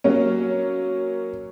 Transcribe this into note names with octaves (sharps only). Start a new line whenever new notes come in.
F#3 A#3 C#4